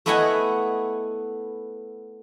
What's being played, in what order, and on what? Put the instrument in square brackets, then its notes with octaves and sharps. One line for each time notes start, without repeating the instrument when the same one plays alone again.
[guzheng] A3 B3 E4 D#5 F#5 G#5